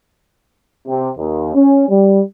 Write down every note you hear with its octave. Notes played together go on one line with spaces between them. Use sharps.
C3
D#2
C#4
G3